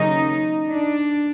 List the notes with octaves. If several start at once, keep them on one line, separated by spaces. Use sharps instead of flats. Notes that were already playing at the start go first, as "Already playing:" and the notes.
Already playing: D#2 C#3 F#3 A#3 C#4 D#4
D4